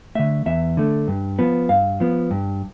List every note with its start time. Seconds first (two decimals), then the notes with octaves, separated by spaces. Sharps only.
0.15 D3 A3 E5
0.46 E2 E5
0.77 D3 A3
1.08 G2
1.39 F3 B3
1.69 G2 F5
2.00 F3 B3
2.31 G2